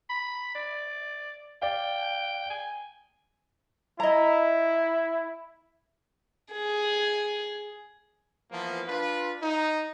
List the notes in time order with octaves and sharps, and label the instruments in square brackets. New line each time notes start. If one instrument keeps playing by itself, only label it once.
[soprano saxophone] B5
D5
[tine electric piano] D5 F5 [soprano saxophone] G5
[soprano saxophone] G#5
[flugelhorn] E4 [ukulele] D#5 A#5
[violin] G#4
[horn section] E3 F3 A#3 B3
D4 F4 B4
D#4